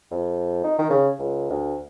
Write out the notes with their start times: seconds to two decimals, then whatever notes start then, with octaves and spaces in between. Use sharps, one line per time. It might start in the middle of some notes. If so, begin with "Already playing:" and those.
0.11 F2
0.64 D#4
0.79 D#3
0.90 C#3
1.19 C#2
1.50 D2